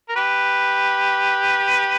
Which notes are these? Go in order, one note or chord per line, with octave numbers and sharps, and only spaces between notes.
A#4
G4 B4